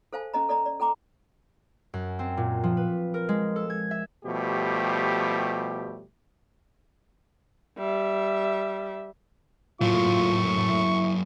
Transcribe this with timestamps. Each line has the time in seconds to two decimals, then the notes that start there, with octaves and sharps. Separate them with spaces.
0.13 A4 C5 F5 G#5 A5
0.34 C#4 A4 D#5 A#5
0.49 A4 D5 D#5 A#5
0.66 D5
0.80 A4 G5 A#5 D6
1.94 F#2
2.19 C4
2.37 A#2
2.63 F3
2.77 B4
3.14 A#4
3.29 G#3
3.56 A4
3.70 G#6
3.91 E5
4.25 B2 F3 G3 A3 G4
7.78 G3 E5
9.81 A2 F#3 A#3 F4 C#6
10.70 E4